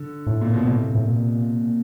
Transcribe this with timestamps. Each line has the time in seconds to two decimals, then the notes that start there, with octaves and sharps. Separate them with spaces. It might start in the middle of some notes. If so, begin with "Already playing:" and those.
Already playing: D3
0.27 A2
0.41 A#2
0.54 B2
0.66 A2 C3
0.95 A2
1.04 A#2